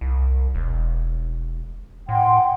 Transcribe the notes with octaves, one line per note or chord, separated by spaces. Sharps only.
C2
E1
A2 F#5 G5 C6